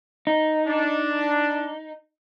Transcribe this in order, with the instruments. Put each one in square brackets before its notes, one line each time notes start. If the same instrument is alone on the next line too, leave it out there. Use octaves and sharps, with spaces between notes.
[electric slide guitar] D#4
[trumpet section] D4